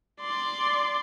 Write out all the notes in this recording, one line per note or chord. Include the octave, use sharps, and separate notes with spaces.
D5 C6